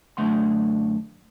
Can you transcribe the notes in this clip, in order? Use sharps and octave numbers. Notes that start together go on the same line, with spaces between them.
F#2 D3 A3 F#5 C6